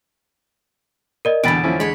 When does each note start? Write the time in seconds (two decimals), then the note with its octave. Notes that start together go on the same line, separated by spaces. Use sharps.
1.25 A#4 D5 D#5
1.44 E2 B2 D3 G5 B5 A6 D7
1.63 F3 C#4 E4
1.80 G#3 C#5 B5